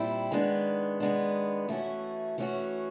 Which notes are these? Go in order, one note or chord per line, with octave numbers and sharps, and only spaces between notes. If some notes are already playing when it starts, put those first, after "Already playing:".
Already playing: A#2 G3 C4 E4
D#3 G#3 B3 D4
D#3 G#3 B3 D4
E3 A3 C#4 F#4
E3 A3 C#4 F#4